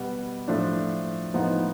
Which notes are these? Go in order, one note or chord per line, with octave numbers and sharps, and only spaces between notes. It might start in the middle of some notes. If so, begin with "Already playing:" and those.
Already playing: B2 G3 B3
A2 F3 A3 D4
A2 F3 G#3 B3 D#4